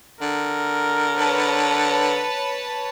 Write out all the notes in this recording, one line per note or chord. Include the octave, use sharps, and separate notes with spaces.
D3 A#4
B4 C#5 A5